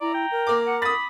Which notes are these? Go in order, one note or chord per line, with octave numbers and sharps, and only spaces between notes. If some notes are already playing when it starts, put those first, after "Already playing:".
E4 D5 A#5
G5
A#4
A#3 D6
F#5
B5 D#6 A6